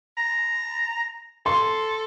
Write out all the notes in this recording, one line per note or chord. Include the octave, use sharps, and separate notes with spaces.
A#5
A4 C6